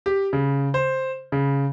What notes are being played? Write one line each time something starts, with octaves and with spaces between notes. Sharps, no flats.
G4
C#3
C5
C#3